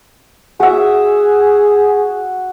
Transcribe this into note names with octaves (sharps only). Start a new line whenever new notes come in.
F#4 G#4 E5